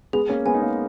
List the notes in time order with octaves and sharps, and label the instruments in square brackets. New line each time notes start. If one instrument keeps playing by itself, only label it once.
[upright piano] G#3 B3 [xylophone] G#4
[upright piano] A#3 C#4
[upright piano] G#3 B3 [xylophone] G#5
[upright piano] D#4
A#3 C#4